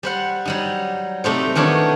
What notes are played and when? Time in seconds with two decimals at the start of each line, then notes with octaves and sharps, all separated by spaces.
0.03 G3 C5 F#5
0.45 F#3 G3 D#4
1.24 C3 A3 D#4 C5
1.55 D#3 E3 B3 D4 C#5